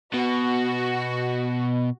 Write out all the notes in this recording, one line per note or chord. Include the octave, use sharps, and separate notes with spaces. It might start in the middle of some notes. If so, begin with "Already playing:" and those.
B2 F#4